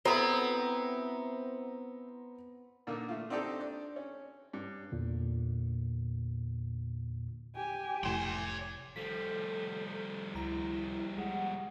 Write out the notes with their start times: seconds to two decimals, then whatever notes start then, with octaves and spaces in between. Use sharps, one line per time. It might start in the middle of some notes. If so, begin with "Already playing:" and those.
0.05 B3 C4 E4 F#4 A4 C5 A#5 B5
2.87 A#2 D3 A#3 D#4
3.09 A3 F4
3.30 C4 D4 D#4 G4 A4
3.60 D4
3.96 C#4
4.53 G2
4.92 E2 A#2 D3
7.55 G4 G#5
8.03 F1 A2 C#5 C6
8.96 F3 G3 A4 B6
10.34 C#2 E4 A#5
11.18 G#3 F#5